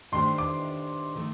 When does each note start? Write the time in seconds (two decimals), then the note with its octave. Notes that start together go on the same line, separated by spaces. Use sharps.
0.12 D#3 A3 D4 G4 C5 C6
0.38 D6
1.16 D#3 A3